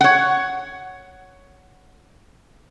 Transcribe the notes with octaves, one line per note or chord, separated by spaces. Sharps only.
C#5 F#5